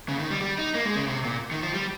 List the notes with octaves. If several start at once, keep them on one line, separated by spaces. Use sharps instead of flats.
C#3
D#3
G3
G3
D#4
A#3
G#3
C#3
C3
A#2
D#3
F3
G3